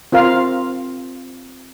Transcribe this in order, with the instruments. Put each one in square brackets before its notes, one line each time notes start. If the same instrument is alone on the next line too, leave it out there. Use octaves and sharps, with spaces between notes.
[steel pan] C4 F4 A#4 F5